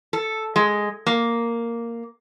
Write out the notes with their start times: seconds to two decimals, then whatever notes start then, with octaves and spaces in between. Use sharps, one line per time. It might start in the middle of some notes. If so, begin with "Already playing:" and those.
0.13 A4
0.56 G#3
1.06 A#3